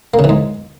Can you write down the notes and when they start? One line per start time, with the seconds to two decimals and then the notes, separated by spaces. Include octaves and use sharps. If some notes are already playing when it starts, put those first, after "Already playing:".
0.14 A#3
0.19 C#3
0.24 E3
0.29 G#2